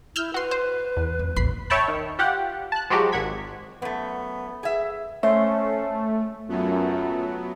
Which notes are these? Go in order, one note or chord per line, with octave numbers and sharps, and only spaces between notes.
E4 E6 F6 G6
F#4 B4 C6
C5
E2
F2
A1 D#2 B5 C7
C#5 E5 G5 A5 B5
D#3
F4 G4 F#5
A5 F#6
F3 F#3 G#3 F#4 G4
G#1 F#5 G#6 B6
F#2 A3 B3
G#4 E5
A3 C#4 C5 E5
F#2 F#3 A3 B3 F4